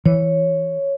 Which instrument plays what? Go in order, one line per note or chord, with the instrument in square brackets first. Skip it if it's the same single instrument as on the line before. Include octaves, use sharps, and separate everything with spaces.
[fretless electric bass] E3 [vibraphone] C#5